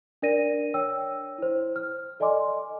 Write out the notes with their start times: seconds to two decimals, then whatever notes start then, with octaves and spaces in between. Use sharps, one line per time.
0.22 D4 A#4 D5 A#6 D#7
0.74 C#5 G5 E6
1.38 E4 C5
1.76 F6
2.20 A4 D5 D#5 G#5 C6 D6